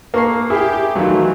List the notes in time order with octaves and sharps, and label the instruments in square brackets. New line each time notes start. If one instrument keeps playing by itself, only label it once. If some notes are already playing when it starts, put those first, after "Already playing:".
[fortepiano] A#3 [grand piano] A4 C#6 C7
[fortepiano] E4 [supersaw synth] G4 [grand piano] G#4
[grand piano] D#3 A3 [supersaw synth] E3 [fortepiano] F#3 F4